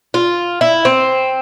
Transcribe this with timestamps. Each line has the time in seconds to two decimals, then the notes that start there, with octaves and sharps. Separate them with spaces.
0.14 F4
0.61 E4
0.85 C4